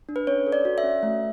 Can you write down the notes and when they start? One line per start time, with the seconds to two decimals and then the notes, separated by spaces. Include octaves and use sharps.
0.09 D4
0.16 B4
0.27 C#4 C#5
0.46 A4
0.52 D5
0.65 F#4
0.78 E5
0.84 C#4
1.03 A3